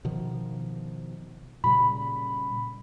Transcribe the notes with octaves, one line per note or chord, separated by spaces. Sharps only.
B2 D#3 F3
A#2 C#3 G3 B5